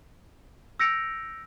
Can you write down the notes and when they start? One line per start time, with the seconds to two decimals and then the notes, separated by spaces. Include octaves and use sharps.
0.79 E6 G6 A#6 C#7 D7 F7